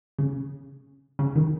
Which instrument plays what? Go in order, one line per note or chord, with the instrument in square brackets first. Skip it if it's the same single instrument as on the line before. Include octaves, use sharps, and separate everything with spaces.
[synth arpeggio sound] C#3
C#3
D#3